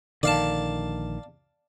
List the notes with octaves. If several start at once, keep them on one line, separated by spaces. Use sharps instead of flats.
A#1 D3 D#3 D5 F5 A5